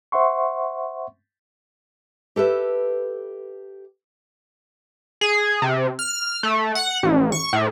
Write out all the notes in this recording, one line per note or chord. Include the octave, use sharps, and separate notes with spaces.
C5 E5 F#5 C6 C#6
G4 A4 B4 E5
G#4
C3
F6
A3
F#5
A1
C#6
A2